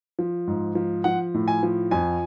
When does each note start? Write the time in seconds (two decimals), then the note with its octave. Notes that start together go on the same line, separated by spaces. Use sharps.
0.19 F3
0.47 G#2
0.75 F3
1.04 F3 F#5
1.34 A2
1.48 G#5
1.63 F3
1.91 F2 G#5